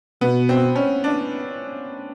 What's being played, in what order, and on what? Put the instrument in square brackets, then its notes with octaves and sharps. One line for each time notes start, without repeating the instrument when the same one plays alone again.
[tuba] B2 [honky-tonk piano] B3
[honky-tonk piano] C4
C#4
D4